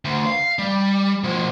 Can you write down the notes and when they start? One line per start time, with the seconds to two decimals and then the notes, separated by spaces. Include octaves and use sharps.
0.05 D2
0.26 F5
0.59 G3
1.24 B2 F3